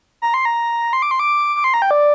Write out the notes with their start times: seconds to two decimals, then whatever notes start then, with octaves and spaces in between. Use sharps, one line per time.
0.22 A#5
0.34 C6
0.45 A#5
0.93 C6
1.02 D6
1.11 C6
1.20 D6
1.56 D6
1.64 C6
1.74 A#5
1.82 G5
1.91 D5